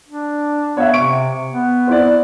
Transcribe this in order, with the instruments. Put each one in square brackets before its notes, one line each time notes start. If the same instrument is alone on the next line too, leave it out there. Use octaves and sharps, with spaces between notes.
[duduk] D4
[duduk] B3 [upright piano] C#5 E5
[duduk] C3 [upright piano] C#6 D7
[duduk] B3
[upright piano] C4 E4 D5